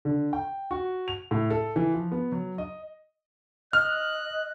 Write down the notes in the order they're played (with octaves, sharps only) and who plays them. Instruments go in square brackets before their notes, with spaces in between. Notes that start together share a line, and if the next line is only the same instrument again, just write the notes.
[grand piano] D3
G5
F#4
F7
A2
A4
E3
F3
B3
F#3
D#5
[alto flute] D#5 [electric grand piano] F6 [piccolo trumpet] F#6